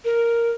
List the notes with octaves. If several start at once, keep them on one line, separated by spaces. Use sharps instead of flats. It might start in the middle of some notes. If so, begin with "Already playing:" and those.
A#4